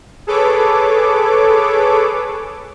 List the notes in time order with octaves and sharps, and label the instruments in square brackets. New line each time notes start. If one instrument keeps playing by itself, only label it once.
[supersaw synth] G#4 A4 B4 C#5 D6